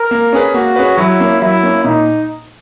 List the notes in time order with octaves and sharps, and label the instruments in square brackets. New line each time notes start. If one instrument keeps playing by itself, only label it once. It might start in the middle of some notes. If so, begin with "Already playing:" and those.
Already playing: [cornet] A#4
[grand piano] A#3
C#4 G#4 B4
[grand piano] A#3 [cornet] F#4
[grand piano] C#4 G#4 B4
[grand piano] F#3 [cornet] E4
[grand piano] A#3 C#4
[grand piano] F#3 [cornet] E4
[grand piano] A#3 C#4
[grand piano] A#2 [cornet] D#4